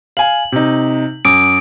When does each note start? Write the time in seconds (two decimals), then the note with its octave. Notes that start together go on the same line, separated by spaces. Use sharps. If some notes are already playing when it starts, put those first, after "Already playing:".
0.17 F5 G#5 F#7
0.52 C3 D#4
1.25 F#2 D6 D#6 D7